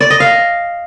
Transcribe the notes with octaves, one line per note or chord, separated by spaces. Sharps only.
D5
D#5
F5